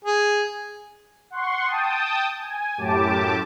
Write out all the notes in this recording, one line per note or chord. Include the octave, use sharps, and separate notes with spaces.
G#4
F#5 C6 C#6
G5 A5 D#6
G#5
F#2 A2 G4 A5 D6